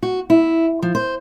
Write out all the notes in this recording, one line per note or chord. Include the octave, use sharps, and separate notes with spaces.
F#4
E4
F3
C5